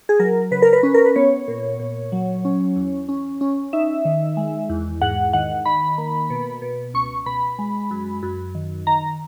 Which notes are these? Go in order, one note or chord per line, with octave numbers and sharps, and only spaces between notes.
G#4
F#3 A#4
C#3 B4
A#4
B4
C#4
A#4
B4
B3 C#5
A#2
A#2
F#3
C#4
E2
C#4
C#4
D#4 E5
D#3
G#3
E2
G#2 F#5
D#3 F#5
D#3 B5
A#3
B2
B2
C#2 C#6
B2 B5
G#3
F#2
F#2
D#3
D#3 A#5